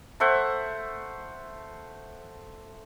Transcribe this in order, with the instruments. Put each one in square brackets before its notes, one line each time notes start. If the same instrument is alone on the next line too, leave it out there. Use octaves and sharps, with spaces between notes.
[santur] A3 C5 E5 F#5